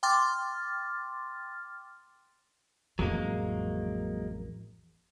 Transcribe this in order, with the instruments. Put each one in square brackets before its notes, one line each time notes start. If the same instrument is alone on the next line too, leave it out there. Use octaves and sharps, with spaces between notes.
[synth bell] G5 C6 D6 F6 A6
[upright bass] A1 F2 [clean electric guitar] F#3 G#3 A#3